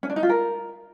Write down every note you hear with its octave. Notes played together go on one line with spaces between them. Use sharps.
C#4
D4
D#4
F4
A#4